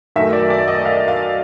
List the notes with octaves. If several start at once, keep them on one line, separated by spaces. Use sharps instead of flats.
F#2 D#3 F#3 A3 E5
D5
D5
D#5
F5
F5